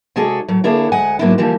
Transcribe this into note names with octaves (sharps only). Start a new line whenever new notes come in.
C3 G#3 D4 F#4 G#4 A4
A2 F#3
D3 A#3 D4 E4 G#4 C#5
D2 G#3 F#5 G#5
G#2 F#3 A#3 B3 D4 E4
D3 E3 F3 G3 A#3